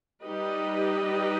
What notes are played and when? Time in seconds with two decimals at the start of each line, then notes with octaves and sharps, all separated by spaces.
0.23 G3 D#4 G4 B4 D#5